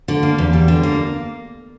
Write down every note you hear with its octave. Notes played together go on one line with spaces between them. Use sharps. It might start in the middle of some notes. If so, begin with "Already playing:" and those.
D3
A#3
E2
G3
D3
A#3